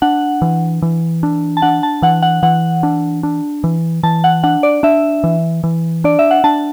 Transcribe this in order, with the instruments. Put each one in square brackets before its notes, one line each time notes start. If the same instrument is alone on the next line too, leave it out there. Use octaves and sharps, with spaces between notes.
[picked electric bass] D4 [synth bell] F#5
[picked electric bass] E3
E3
D4
[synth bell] A5
[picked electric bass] D4 [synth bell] F#5
[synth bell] A5
[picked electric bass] E3 [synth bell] F#5
[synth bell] F#5
[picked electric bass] E3 [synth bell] F#5
[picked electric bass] D4
D4
E3
[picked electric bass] E3 [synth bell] A5
[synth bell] F#5
[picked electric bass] D4 [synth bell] F#5
[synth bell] D5
[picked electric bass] D4 [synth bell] E5
[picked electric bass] E3
E3
[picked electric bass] D4 [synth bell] D5
[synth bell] E5
F#5
[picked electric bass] D4 [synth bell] A5